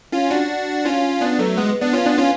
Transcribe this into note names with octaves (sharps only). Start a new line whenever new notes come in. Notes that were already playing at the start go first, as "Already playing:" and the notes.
C#4 F4
D4 F#4
C#4 F4
B3 D4
F#3 A3
G#3 B3
B3 D4
C#4 F4
B3 D4
C#4 F4